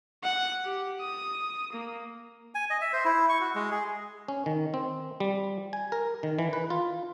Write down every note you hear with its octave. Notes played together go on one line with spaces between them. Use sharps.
F#5
G4
D#6
A#3
G#5
D#5
E5
C5
E4
C#6
F#4
G#3
G#4
C#4
D#3
C4
G3
G#5
A#4
D#3
E3
B4
F4